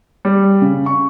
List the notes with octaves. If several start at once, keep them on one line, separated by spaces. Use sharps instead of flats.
G3
C#3
C#6